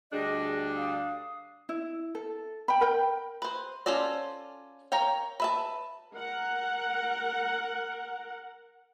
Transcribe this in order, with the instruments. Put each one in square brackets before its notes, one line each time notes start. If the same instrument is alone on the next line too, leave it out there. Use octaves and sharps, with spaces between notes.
[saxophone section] D2 G3 D4 [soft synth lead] G#4 [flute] D#5
[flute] F5 [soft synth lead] D#6
[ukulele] E4
A4
G5 B5
A#4 G5
[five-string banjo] B4 C5
C#4 F4 A4 C5 D5
A#4 C#5 F5 G5
B4 E5 A5
[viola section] A#4 F#5